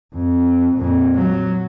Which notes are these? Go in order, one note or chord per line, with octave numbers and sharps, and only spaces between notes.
F2
F2 A#2
F#3